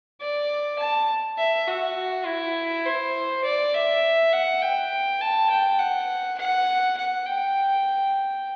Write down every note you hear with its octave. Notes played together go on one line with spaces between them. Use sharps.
D5
A5
E5
F#4
E4
C5
D5
E5
F#5
G5
A5
G5
F#5
F#5
F#5
G5